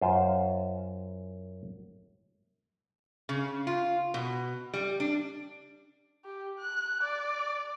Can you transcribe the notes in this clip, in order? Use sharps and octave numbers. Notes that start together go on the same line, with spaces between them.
F#2 F4 C5
C#3
F4
B2
G3
D4
G4
F#6
D5